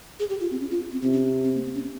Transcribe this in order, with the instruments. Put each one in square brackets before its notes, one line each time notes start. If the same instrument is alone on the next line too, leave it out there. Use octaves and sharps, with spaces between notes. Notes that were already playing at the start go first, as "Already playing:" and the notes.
[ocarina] G#4
G4
F4
C4
C#4
F4
C4
[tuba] C3 [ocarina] C4
[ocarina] C#4
C4
A#3
C4
C#4